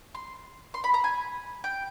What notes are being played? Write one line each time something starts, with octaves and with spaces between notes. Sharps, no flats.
C6
C6
B5
A#5
G#5
G5